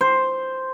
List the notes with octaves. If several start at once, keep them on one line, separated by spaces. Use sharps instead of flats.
C5